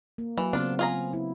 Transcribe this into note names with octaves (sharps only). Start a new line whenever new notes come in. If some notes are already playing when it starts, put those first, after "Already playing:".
A#3
E3 F#3
C#3 B3 C4 D4 F4
F4 G#4 A#5
E4